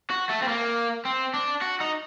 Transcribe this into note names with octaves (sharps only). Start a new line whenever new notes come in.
F#4
A3
C4
A#3
C4
D4
F#4
D#4